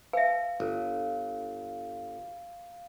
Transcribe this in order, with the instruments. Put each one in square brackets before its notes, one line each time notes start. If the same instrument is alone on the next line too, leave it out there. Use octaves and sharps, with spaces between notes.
[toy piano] B4 E5 [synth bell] F5
[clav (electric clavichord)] G1